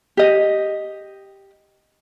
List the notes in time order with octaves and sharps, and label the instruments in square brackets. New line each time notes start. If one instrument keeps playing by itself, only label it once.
[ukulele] G4 D#5